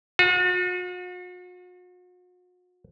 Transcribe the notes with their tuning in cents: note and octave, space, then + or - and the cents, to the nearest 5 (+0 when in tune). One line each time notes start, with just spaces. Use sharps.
F#4 -45